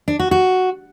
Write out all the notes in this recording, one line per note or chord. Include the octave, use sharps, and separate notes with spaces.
D4
F#4
F#4